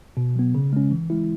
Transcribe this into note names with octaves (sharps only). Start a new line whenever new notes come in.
B2
F#3 B3
C#3
G#3 C#4
E3
G#3 E4